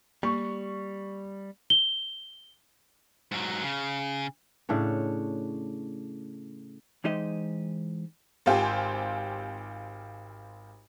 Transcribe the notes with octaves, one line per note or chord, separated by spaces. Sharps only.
G3 A#3 C#6
G7
G#2 F#3
C#3
A2 C#3 D4 C#5
E3 G#3 D#4 G4 C5 D#5
G#1 C4 F4 G4 C5 G#5